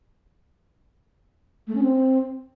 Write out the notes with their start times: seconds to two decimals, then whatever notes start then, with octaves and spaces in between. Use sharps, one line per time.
1.67 A3
1.75 C#4
1.83 C4